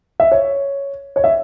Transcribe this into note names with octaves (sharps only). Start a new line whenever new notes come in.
E5
C#5
C#5
E5